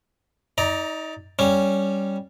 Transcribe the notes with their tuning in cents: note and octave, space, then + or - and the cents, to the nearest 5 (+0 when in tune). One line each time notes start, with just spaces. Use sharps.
D#4 +30 D5 +0 A#5 +0
G3 +0 C#4 +0